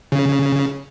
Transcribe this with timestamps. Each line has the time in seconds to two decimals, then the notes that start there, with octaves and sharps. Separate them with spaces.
0.12 C#3